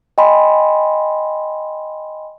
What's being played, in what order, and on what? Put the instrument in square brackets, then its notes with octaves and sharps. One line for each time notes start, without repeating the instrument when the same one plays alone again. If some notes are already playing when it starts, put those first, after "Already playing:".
[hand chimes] D#5 G5 G#5 B5 C6